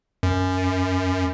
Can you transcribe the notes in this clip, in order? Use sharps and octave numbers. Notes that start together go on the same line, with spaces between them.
F#2